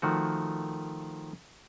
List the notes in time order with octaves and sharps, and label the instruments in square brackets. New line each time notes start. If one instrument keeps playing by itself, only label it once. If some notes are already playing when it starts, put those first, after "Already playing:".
[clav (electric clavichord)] D#3 F3 A3 F#4